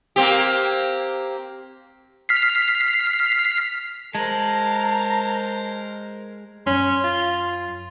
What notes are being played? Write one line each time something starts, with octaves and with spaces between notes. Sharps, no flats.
A#3 C4 G4
F6 B6 C7
G#3 A#4 C5 A5 A#5
F#2 C#4 C6
F4